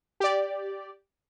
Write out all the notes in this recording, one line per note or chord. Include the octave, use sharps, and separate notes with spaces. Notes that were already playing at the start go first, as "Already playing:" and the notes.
G4 D5